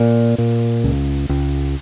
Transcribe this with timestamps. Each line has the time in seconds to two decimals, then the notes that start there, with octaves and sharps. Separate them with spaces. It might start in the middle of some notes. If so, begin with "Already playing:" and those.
Already playing: A#2
0.38 A#2
0.84 C#2
1.29 C#2